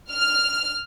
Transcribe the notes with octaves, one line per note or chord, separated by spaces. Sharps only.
F6